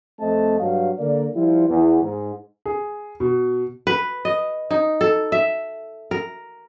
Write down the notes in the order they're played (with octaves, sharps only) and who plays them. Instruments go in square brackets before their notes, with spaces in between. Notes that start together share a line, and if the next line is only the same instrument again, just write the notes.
[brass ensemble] F2 A3 C4 D#5 A5
G2 F#3 F5
D3 A#3 A#4 D5
F3 G3 E4 F4
E2
G#2
[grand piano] G#4
B2
[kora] B4
D#5
D#4
A4
E5
A#4